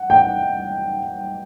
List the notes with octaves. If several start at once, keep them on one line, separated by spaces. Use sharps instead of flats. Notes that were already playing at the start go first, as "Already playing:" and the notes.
Already playing: F#5
G5